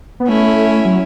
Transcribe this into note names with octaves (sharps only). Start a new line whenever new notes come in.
B3
A3 C#4 E4
F#3